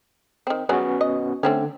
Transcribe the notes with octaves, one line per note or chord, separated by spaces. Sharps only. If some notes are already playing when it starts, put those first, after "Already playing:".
D#3 C4
F3 F#3 B3 C#4 F#4 G#4
D#5
D3 A3 C4 C#4